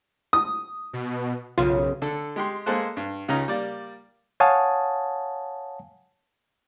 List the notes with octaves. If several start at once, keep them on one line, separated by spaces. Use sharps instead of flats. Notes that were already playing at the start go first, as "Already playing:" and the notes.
D#6
B2
B1 F#2 C#3 F4
D3 A4
G#3 G4 C6
G#3 A#3 G#4 A4 C5 F#6
G2
C#2 C#3 C#4 D#4 F4 A#5
G3 A#3 D5
C#5 F5 F#5 G#5 A5 D#6